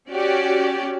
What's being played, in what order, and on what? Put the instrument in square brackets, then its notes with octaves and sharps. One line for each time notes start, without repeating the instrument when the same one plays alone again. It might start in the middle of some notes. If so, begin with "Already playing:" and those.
[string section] C#4 F#4 G4 D5